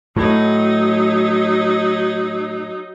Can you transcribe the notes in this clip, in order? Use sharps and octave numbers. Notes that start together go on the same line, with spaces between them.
A2 F#3 D#4